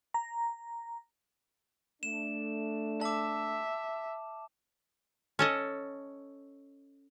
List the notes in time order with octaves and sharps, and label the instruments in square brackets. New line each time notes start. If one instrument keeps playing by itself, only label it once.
[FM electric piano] A#5
[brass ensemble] A3 D4 [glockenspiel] E7
[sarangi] E5 [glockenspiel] A5 D6
[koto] C#4 A4 D#5